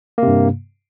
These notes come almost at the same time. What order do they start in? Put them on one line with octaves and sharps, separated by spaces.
A#3 C3 G2